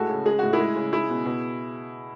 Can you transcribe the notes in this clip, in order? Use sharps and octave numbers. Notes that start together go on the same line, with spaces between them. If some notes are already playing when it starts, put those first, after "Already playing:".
Already playing: A2 G#3 F#4 A4
C#3
G#3 G#4
A2 F#4
E4 G#4
G#3
C#3
G#3 E4 G#4
B2
B2